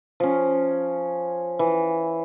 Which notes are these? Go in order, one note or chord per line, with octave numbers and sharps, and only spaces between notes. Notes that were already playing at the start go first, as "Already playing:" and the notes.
F3 C#4
E3